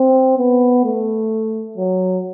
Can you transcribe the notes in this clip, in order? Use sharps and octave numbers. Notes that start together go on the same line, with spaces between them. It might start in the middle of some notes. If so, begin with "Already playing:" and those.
Already playing: C4
B3
A3
F#3